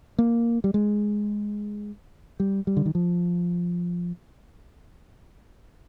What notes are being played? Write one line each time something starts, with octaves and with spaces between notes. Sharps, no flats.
A#3
G3
G#3
G3
G3
D3
D#3
F3